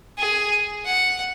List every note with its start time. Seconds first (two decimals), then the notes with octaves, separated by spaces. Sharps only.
0.18 G#4
0.86 F#5